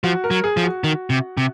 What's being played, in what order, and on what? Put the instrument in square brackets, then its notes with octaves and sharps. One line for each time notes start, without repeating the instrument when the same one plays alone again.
[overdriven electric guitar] F3 [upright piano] F#4
[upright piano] A#4
[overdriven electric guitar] F#3
[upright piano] G#4
[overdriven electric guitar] F3
[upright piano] F#4
[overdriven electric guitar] D#3
C3
C3